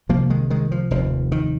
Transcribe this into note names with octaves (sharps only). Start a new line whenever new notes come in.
C2 C3 F3 A#3
D#3 G#3
D#3 G#3
F3
F1 D#2 F3
D#3